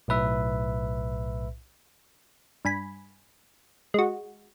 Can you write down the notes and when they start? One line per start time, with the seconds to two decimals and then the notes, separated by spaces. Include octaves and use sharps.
0.08 B1 A2 B4 E5
2.65 G2 G#5 B5
3.94 G#3 F#4